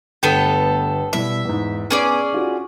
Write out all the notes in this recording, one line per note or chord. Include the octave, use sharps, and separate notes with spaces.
G1 A3 B3 A4 G5 D#7
B2 G3 E4 E5
E2 G#2
B3 C#4 G#4 D5
D#4 F4 F#4